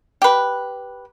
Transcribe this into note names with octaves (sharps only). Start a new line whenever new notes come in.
G4 B4